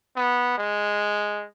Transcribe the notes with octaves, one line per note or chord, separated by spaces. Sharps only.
B3
G#3